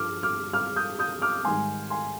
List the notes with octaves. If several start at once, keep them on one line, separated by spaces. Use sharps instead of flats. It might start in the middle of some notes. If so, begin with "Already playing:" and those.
Already playing: G2 F3 D6 F6
D6 F6
D6 F6
D#6 G6
D#6 G6
D6 F6
G#2 D#3 G3 G#5 C6
G#5 C6